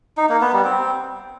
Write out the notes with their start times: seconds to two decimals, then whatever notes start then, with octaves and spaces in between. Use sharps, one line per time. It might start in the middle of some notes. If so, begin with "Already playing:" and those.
0.17 D#4
0.29 A#3
0.41 B3
0.53 G3
0.65 C4